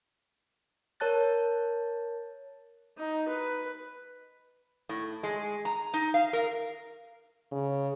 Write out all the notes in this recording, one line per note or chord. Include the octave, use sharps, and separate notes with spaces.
A#4 C#5 A5 F#6 A6
D#4
B4
A2
G#3
A#5
D#4
F5
A#4
C#3